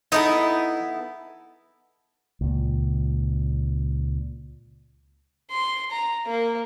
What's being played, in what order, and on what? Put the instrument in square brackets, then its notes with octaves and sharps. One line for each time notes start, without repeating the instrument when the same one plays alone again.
[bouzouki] B3 E4 A4 [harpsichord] D#4
[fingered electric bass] C#2 A#2
[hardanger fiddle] C6
A#5
A#3